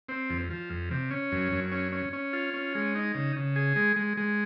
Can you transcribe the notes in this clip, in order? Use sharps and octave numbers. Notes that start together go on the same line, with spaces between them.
C4
F2
F3
F2
C3
C#4
F#2
F#2
C#4
C#4
C#4
F4
C#4
G#3
D#4
C#3
C#3
G#4
G#3
G#3
G#3